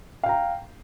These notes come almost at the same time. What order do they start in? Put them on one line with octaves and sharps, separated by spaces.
F5 G5 A#5